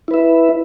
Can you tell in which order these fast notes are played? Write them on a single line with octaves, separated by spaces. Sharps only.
E4 B4 E5